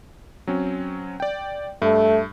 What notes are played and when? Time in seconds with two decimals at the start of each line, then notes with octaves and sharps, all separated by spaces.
0.47 F#3 C4 C#4
1.20 D5 G5
1.82 G2 A3